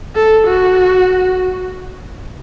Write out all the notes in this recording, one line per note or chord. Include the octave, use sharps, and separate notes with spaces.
A4
F#4